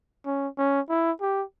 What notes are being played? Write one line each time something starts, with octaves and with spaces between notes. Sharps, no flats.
C#4
C#4
E4
G4